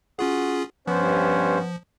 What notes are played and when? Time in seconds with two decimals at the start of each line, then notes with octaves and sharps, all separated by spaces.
0.19 C#4 F4 F#4 G#4
0.87 G2 F3 B3 C#4 C5